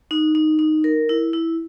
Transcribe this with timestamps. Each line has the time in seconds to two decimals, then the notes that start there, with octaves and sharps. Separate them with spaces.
0.11 D#4
0.35 D#4
0.59 D#4
0.84 A#4
1.09 E4
1.33 E4